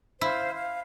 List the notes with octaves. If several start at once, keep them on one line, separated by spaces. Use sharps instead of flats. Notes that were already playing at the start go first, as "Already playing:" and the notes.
E4 C5 F5
F5